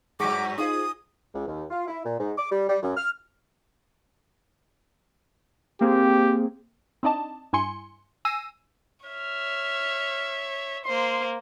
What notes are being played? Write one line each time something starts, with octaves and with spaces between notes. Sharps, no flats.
G2 F#3 G#4 C#6 D6 B6
D#4 F4 G#4 C5 D#6
C#2
D#2
F4
E4
A#2
G#2
D6
G3
G3
F#2
F6
A#3 C4 G4 G#4
C4 D4 D#4 D5 D#5 A5
G2 E4 G#5 C6 C#7
G#5 E6 A#6 C7 D#7
C#5 E5 F6
A#3 C5 C6